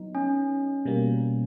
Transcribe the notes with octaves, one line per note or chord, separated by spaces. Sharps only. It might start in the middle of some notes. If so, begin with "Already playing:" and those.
Already playing: F#3 B3 D#4
C#4
B2 G3 A#3